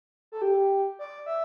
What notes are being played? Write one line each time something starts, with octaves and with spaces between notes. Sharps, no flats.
A4
G4
D5
E5